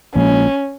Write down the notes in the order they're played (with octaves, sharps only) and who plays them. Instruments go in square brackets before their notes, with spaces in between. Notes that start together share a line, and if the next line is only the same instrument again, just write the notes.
[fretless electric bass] A#1 A#2 F3 G#3 [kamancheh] C#4